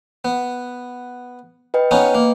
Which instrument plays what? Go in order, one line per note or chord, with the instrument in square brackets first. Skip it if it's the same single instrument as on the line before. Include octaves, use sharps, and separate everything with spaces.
[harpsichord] B3
[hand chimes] B4 D#5 G5
[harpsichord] B3 C#4 D#4
A#3